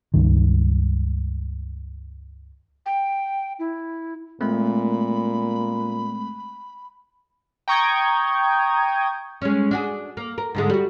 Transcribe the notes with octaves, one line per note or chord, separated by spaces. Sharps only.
C#2 G2 D#3
G5
E4
A#2 G#3 A3 C4 B5
G5 A#5 C#6 D#6 G6 G#6
G#3 C#4
D4 F#4 G#4
A#3
A#4
G#2 D3 G#3
G3 F#4